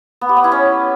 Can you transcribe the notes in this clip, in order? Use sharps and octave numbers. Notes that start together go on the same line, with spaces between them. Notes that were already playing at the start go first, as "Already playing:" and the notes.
B3
G4
B3
E4
C#4